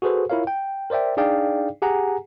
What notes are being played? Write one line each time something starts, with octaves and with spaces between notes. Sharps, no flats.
F#4 G#4 A4 B4 C5
E4 F4 A#4 C#5 F5
G5
A#4 C5 D5 E5 G5
D4 D#4 G#4 D5 F5 G5
G4 G#4 F#5 G#5 A#5